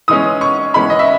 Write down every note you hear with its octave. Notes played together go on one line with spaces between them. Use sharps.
E3 G#3 C#4 D#6
C#6
E3 G#3 C#4 B5
D#5
E5